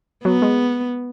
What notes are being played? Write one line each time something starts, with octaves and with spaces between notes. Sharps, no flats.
F#3 B3
G#3